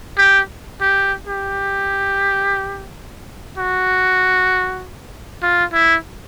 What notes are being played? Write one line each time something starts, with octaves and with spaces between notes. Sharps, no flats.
G4
G4
G4
F#4
F4
E4